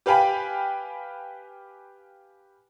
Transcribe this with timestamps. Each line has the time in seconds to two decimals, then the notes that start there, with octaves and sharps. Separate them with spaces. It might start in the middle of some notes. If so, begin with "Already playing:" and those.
0.06 G4 B4 F5 G5 G#5 B5